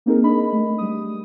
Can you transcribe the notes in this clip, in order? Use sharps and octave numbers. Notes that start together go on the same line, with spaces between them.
A#3 C4 D#4 G#4 A#4
D4 A#4 D#5 B5
A3
G3 D#6